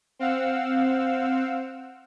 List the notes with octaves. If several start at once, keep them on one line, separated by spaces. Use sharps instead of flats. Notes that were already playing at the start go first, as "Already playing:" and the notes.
C4 F5 F#5 E6